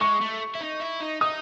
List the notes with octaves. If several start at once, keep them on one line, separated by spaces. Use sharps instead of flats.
G#3 C#6
A3
E4
D#4
E4
D#4
D#4 D#6